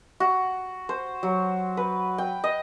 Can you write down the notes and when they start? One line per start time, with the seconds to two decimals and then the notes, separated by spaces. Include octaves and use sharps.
0.20 F#4
0.89 C5
1.23 F#3
1.77 B4
2.18 G5
2.44 D#5